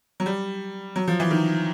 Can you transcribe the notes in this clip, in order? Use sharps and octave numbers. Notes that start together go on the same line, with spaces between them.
F#3
G3
F#3
F3
E3
D#3